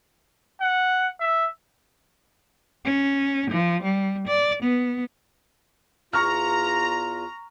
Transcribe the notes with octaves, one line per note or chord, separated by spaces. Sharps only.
F#5
E5
C#4
F3
G3
D5
B3
E2 F4 A#5 C#6 F6